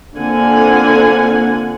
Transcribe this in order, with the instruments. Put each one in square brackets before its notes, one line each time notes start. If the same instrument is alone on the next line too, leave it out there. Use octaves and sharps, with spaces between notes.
[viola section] D3 A#3 C4 F4 F#5 G#5